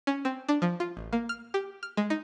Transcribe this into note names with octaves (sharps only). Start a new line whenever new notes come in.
C#4
C4
D4
F3
F4
A1
A#3
F6
G4
F6
G#3
D#4